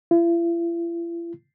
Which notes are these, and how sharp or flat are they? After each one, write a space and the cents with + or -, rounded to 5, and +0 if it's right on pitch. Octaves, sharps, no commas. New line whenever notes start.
E4 +45